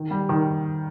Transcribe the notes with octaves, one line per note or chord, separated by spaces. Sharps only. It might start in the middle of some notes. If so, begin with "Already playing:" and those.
Already playing: D#3
G3
D#3